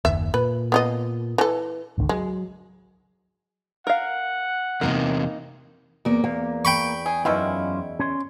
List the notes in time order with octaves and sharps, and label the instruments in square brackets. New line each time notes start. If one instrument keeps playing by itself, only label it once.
[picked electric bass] F#1 D#2 [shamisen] E5
[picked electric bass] A#2 [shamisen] B4
[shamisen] B3 F4 D#5
E3 A4
[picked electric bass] G#1 C#2 D3
[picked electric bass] F#3 [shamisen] G#3
[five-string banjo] A#4 F5 [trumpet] F#5
[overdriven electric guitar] E2 C3 [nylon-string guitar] A#3 D#4 D#5 [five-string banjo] A#4
[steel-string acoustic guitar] E2 A#3
[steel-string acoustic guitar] E2 [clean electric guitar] A#3
[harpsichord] G5 B5 C#6
[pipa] G#4
[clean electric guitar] F#2 C#4 F4 [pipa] B2 D#3 E4
[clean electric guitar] C#4 C#5 C6